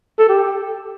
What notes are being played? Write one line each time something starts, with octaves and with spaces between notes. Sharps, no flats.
A4
G4